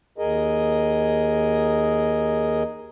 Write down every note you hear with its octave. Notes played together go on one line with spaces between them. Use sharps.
D#2 G#4 A#4 D#5